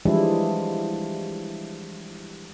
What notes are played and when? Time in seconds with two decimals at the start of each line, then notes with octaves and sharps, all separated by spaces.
0.05 E3 F3 G3 G#3 D4 E4